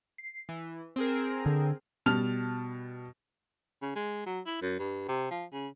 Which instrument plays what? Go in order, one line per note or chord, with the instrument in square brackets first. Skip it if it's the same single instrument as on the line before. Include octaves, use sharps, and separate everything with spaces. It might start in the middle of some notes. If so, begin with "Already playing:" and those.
[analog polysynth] C7
E3
C4 G#4 A#4
[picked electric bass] D3
[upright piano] B2 G3 A5 F6 F7
[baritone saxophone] C#3
G#3
F#3
E4
F#2
G2
C3
F3
C#3